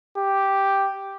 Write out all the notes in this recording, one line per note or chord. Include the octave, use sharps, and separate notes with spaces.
G4